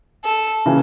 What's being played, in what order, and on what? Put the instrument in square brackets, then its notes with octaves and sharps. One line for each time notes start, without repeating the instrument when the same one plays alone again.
[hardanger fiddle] A4
[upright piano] C#3 E3